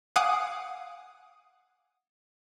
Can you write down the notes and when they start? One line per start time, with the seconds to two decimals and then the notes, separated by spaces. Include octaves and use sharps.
0.16 F5 F#5 G#5 D6 D#6